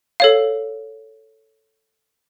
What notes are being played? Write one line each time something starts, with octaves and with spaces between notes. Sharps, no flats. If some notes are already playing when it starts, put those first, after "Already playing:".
A4 C#5 F5